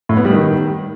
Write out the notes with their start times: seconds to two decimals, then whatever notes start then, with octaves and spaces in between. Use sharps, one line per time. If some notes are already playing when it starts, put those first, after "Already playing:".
0.09 A2
0.17 B3
0.25 G3
0.33 D#3